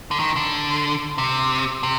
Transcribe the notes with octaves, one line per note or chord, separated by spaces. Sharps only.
D3
D#3
D3
C3
C3